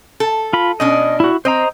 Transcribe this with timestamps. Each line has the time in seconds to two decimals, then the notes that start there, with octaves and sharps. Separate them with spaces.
0.20 A4
0.53 F4 B5
0.80 B2 C#4 D4 D#5
1.20 E4 F#4
1.45 C4 C5 D#5 A#5